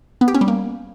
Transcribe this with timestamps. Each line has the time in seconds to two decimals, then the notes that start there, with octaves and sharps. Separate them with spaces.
0.21 B3
0.28 G4
0.34 C#4
0.41 G3
0.48 A#3